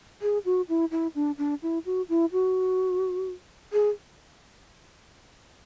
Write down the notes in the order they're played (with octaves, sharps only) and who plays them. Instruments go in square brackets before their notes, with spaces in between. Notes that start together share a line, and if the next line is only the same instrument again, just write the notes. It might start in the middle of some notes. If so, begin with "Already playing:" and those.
[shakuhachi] G#4
F#4
E4
E4
D4
D4
E4
F#4
E4
F#4
G#4